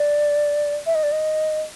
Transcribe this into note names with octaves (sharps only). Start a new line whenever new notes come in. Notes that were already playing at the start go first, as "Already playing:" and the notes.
Already playing: D5
E5
D#5
D5
D#5